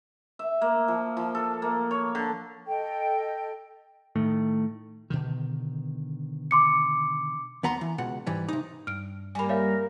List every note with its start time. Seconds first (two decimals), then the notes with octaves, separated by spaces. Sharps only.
0.39 E5
0.61 A#3
0.88 F3
1.17 F3
1.35 A4
1.62 A#3
1.91 C#5
2.15 D3
2.67 A4 D#5 G5
4.16 A2 D#3 A3
5.10 B2 D3 D#3
6.51 C6 D6 C#7
7.63 D#2 B3 A#5 C6
7.81 E3
7.98 C#2 B2 F#5
8.27 G#2 E3 G3
8.48 C3 D#4
8.87 G2 F6 D7
9.35 G3 A#3 G#5 B5
9.49 A#4 C#5 E5 F5